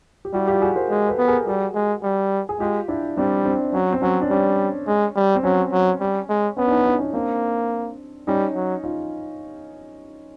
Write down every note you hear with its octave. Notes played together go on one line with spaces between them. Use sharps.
G4
G3 E4 F#4
F4 G4
F#4 G#4
A#4 C5
G#3
A4 B4
B3
G#4 A#4
G3 F#4 G#4
G#3
G3
G#4
G#3 F4 G4
D4 E4
G3 C4 D4
C4 D4
F#3 C#4
C4
F#3 C#4
D4
G3 C#4
G#3
G3
C4
F#3 C#4
F#3
G3
G#3
B3 C#4
D4
C#4 D#4
D4 E4
C#4
A#3 C4 D4
G3 C#4 D#4
F#3
D#4 F4